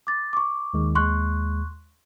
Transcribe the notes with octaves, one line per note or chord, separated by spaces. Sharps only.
D6 A6
C#6 D6
D#2 D#3 G#3
D#2 G#3 C6 C#6 F#6